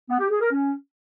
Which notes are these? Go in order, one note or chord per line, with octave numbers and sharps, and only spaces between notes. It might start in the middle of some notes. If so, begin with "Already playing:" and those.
B3
G4
G#4
A#4
C#4